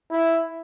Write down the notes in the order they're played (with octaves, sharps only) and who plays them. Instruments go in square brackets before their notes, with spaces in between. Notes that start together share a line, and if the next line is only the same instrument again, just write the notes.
[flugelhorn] E4